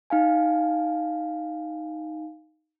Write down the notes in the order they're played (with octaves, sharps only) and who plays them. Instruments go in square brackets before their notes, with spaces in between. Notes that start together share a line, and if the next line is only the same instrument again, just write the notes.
[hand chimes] D#4 F5 G#5